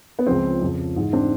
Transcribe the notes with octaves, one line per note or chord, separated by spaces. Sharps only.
B3
C#2 C#3 F3 C4
F2 C#3 F3
G#2 E3
C4 D4